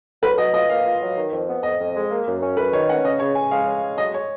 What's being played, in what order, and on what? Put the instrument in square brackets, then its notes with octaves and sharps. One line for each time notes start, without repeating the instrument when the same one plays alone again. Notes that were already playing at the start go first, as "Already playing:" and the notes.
[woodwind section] F#3 [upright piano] B4
[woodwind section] F#3 [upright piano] D#5
[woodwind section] F4 [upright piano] D#5
[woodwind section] A#3 [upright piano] F5
[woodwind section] F4
F#3
D#3
F2
B3
[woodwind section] F2 [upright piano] D#5
[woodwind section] F2
G#3
A#3
F#2
C#4
[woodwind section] F#2 [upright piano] B4
[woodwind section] D#3 [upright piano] C#5
[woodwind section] C#4 [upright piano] F#5
[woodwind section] C#3 [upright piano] D#5
[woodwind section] C#3 [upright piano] C#5
[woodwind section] C#3 [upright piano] G#5
[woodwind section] G#3 [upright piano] F5
[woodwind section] C#3
G#3
[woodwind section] F#3 [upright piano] D#5
[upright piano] C#5